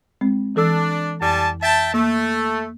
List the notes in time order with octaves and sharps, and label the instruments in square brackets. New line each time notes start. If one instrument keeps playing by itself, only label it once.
[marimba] G#3 C4
[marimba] E3 A4 E6 [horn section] D4
[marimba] F2 [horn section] G3 G#5 A5
[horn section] E5 G5 A5
[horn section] A3 [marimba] A#3